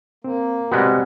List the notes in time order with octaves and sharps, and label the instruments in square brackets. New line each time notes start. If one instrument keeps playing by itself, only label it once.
[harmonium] A#3 [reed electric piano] C4
[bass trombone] C3 [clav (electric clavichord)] G3 G#3 B3 [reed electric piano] F#4 F#5